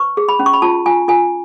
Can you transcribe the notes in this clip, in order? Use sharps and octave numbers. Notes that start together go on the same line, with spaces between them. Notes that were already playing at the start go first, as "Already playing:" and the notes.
Already playing: B4 C#6
G#4
B5
C#4
C#6
B5
F4 A5
F4 G#5
F4 G#5